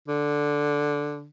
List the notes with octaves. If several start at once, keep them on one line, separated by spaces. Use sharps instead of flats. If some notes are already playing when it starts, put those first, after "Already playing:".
D3